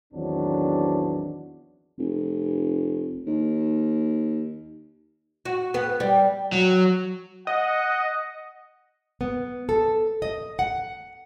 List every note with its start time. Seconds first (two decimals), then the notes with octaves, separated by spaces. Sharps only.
0.13 A1 E2 D#3 F#3 C4 D4
1.99 F1
3.26 D#2
5.45 F#4
5.74 B3
6.00 G3
6.52 F#3
7.47 D#5 F#5
9.21 B3
9.69 A4
10.22 D#5
10.59 F#5